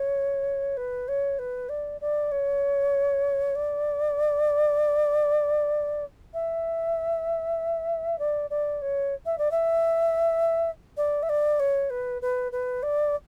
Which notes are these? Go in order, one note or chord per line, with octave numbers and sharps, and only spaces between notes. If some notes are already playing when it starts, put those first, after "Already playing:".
Already playing: C#5
B4
C#5
B4
D5
D5
C#5
D5
E5
D5
D5
C#5
E5
D5
E5
D5
E5
D5
C#5
B4
B4
B4
D5